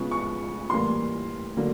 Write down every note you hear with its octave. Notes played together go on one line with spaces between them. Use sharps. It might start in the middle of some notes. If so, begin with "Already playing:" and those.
Already playing: C#3 F3 G#3 B3 C#6
C#6
A2 E3 G3 A#3 C6
D3 F#3 A#3